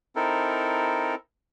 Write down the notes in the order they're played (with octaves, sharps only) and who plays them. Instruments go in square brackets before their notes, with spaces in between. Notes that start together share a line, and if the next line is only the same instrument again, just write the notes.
[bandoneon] C4 D#4 E4 A4 A#4